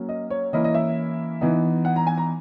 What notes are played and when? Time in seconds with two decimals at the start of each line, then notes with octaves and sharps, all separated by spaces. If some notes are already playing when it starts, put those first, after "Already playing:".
Already playing: F#3 A#3 C#4
0.09 D#5
0.30 C#5
0.53 E3 A#3 C#4 E4 D#5
0.64 D#5
0.74 E5
1.41 E3 B3 D#4
1.85 F#5
1.96 A#5
2.07 G#5
2.18 A#5